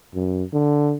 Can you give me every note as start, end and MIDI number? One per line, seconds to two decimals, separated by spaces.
0.15 0.44 42
0.53 0.96 50